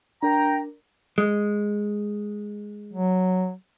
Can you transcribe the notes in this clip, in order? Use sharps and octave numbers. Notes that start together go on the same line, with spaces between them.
D4 A#4 G5 A#5
G#3
F#3